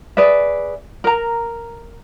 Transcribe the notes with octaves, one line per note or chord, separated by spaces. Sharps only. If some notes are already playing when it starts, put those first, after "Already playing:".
G#4 B4 D5 E5
A#4 A#5